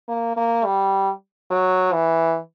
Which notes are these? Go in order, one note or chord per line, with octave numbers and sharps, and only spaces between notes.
A#3
A#3
G3
F#3
E3